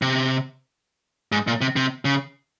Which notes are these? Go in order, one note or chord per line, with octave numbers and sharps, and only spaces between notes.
C3
G#2
A#2
C3
C3
C#3